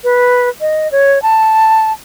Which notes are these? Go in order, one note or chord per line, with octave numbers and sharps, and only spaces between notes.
B4
D#5
C#5
A5